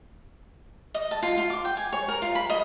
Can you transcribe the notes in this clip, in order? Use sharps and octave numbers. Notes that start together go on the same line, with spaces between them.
D#5
A5
F4
F4
D6
G5
G#5
C#5
A#4
F4
B5
D#5